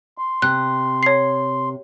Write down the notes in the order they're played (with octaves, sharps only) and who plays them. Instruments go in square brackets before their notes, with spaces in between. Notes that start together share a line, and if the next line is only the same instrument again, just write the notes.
[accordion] C6
[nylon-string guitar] C3 [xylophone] F#6
[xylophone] C#5 C7